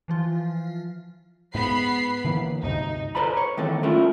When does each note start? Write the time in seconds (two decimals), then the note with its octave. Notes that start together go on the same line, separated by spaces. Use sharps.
0.08 E3 F3 F4
1.55 G#2 B3 B5 C7
2.25 D3 E3 A#3
2.63 D2 G2 C3 D#4
3.15 A4 B4 C5 D5 A#5 B5
3.37 C#5
3.57 D#3 E3 A#3 C4 A4
3.83 A3 C#4 E4 F4 A4 A#4